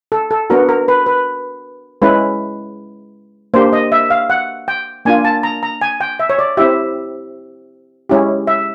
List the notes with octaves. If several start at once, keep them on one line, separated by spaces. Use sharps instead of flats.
A4
A4
B3 D4 F#4 A#4
A#4
B4
B4
G#3 C#4 E4 B4
A#3 D4 G4 C5
D#5
E5
F5
F#5
G5
A#3 D4 F4 G#5
A5
A#5
A#5
G#5
G5
E5
C#5
D5
C4 E4 G4 E5
G#3 C#4 E4 G4
E5